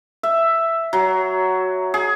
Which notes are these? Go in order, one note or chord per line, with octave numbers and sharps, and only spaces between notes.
E5
F#3
G#4